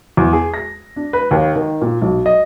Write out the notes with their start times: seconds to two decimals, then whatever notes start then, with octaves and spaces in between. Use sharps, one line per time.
0.17 E2
0.33 G#4
0.54 A#6
0.96 D4
1.13 B4
1.31 D#2
1.56 D#3
1.82 A#2
2.02 B1
2.26 D#5